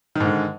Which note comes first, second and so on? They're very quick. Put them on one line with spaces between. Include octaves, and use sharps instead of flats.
D#3 G#2 D3